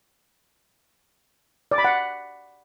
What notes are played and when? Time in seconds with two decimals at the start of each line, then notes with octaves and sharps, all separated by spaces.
1.72 D5
1.78 B5
1.85 F#5